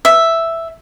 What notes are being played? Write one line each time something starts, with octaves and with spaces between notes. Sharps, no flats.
E5